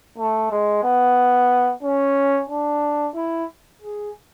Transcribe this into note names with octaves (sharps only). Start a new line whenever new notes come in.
A3
G#3
B3
C#4
D4
E4
G#4